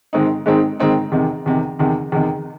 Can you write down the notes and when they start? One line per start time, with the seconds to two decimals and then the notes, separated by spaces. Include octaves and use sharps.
0.13 G#2 D#3 G#3 C4 D#4
0.46 G#2 D#3 G#3 C4 D#4
0.80 G#2 D#3 G#3 C4 D#4
1.12 E2 C3 D#3
1.46 E2 C3 D#3
1.79 E2 C3 D#3
2.12 E2 C3 D#3